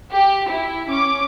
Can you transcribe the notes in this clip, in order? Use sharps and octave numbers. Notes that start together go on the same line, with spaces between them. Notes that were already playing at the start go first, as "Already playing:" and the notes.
G4
E4
C#4 D6